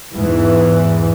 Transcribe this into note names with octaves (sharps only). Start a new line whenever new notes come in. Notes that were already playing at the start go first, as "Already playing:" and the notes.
E2 G#2 E3